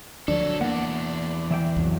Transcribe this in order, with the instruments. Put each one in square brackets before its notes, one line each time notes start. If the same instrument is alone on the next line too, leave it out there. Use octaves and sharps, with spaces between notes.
[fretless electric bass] D2 F3 [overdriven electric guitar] F#3 A4 [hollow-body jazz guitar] D4
[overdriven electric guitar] E2 D4 [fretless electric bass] A#3 [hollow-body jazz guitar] F#5
[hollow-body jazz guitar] E3 E5 G5
[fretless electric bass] C2 F2 F#3